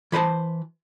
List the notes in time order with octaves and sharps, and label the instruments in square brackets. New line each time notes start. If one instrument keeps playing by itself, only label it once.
[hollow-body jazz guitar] E3 B4 C5 A5